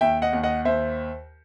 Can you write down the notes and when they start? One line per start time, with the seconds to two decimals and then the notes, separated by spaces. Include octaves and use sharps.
0.01 D#2 E5 G5
0.22 D#5 F#5
0.33 D#2
0.43 D#5 F#5
0.65 D#2 C5 E5